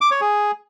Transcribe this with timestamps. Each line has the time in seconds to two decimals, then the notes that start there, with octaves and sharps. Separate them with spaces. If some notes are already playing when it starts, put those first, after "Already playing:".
0.01 D6
0.11 C#5
0.21 G#4